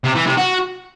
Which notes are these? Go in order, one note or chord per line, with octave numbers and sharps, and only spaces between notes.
C3
E3
C3
F#4